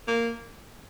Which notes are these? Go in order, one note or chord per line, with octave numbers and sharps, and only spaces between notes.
A#3